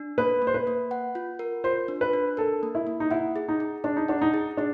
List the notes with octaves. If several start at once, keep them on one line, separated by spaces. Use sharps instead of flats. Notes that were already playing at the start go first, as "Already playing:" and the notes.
Already playing: D4
A#3 B4
A#3
C5
B4
A#3
F#5
F4
A#4
F4 C5
D4
B4
D4
A4 A#4
A#3
E4
A#3
D#4
E4 F#5
G#4
D#4
G#4
D4 A5
D#4
D4 F#5
D#4
G#4
D4 G#4